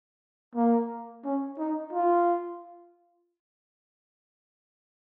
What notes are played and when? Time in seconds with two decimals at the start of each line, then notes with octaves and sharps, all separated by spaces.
0.56 A#3
1.25 C#4
1.59 D#4
1.93 F4